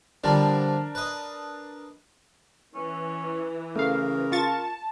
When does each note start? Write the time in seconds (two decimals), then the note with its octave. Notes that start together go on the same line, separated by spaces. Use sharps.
0.24 D3 F3 G3 D4 A#4 A5
0.95 B4 D#5
2.75 E3 C#4
3.76 C#3 A3 A#4 F5
4.32 F4 A5 C#6 A6